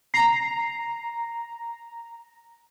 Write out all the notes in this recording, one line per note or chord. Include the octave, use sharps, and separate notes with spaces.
A#5 C7